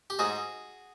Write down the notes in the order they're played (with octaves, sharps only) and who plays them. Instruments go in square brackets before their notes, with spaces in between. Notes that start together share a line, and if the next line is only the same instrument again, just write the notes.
[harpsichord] G4
G#2 F#4 G#4